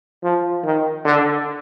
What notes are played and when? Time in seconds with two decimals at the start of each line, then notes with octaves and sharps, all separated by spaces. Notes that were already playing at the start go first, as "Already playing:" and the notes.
0.24 F3
0.65 D#3
1.05 D3